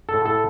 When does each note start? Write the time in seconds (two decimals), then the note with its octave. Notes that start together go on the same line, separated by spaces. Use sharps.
0.09 A4
0.14 A2
0.26 A4